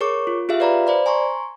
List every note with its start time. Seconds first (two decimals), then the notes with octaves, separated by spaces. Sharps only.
0.01 G#4 A#4 C#5 C#6 D6
0.27 F4
0.49 F4 G4 G#4 E5 F5
0.60 B4 D5 F5 A#5 B5
0.87 C5 D5 B5
1.06 G#5 A#5 C6 C#6